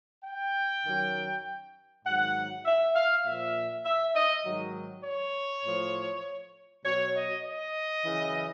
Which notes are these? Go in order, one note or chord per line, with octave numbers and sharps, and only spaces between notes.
G5
F#2 D#3 F#3
G#2 D#3 F#3 F#5
E5
F5
A#2 F3 E5
E5
D#5
G#2 D#3 F#3
C#5
A2 F3
B2 F#3 C#5
D#5
D#5
F#2 C#3 E3